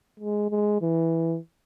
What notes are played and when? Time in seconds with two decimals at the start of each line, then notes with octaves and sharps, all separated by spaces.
0.20 G#3
0.50 G#3
0.82 E3